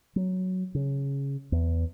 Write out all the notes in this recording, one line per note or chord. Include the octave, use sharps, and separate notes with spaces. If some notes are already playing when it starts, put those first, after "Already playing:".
F#3
C#3
E2